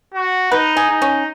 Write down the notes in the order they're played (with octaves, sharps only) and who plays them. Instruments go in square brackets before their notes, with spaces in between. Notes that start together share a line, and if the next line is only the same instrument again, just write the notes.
[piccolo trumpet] F#4
[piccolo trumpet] D#4 [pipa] B4
[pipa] G#4
[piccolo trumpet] D#4
[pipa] C#4